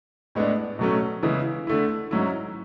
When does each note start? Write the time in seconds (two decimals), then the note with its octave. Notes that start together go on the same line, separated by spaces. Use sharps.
0.35 A2 G#3 B3 D4
0.79 B2 F#3 A3 C#4
1.23 C#3 E3 G#3 B3 E4
1.67 D3 A3 E4
2.11 G#2 F#3 C#4 E4